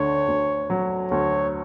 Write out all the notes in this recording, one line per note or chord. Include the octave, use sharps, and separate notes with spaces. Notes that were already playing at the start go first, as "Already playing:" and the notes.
Already playing: D2 D3 C#5
D2
F#3
D2 C#5